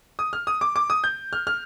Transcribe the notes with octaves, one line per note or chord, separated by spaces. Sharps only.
D#6
F6
D#6
D6
D6
D#6
G6
F6
F6